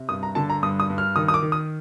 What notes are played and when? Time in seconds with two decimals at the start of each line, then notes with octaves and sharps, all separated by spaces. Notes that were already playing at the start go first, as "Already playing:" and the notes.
Already playing: C3
0.09 G2 D#6
0.23 A#5
0.35 D3 A5
0.50 A#5
0.63 G2 D#6
0.80 D#6
0.90 G2
0.98 F6
1.16 D#3 D#6
1.28 D#6
1.34 D6
1.42 D#3
1.52 D#6